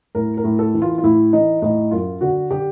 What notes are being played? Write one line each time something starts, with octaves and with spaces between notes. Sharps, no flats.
A2 A#4
A#4
A2
A4
E3
F4
F4
A2 E4
E3 D#4
A2 D#4
F#2 F4
D3 F#4
D3 G4